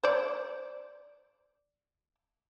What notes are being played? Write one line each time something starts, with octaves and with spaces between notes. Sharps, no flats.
C5 D5